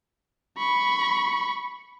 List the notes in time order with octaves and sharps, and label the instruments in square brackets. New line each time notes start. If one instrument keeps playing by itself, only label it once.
[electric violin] B5 C#6